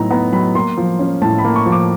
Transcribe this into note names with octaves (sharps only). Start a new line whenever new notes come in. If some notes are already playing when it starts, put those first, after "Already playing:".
Already playing: A2 F#3 B3 D#4 A#5
B3 A#5
F#3 B5
A#3 C6
F3
C#4
A2 A5
B5
A#3
C#6
F3
D6